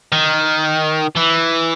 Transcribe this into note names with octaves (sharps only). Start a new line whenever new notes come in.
D#3
E3